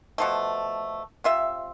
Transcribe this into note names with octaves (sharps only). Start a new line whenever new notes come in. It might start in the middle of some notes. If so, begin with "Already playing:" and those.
B2 F3 A3
C3 F4 E5